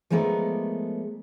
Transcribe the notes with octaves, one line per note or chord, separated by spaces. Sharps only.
F3 G#3 A3 B3 A#4 D5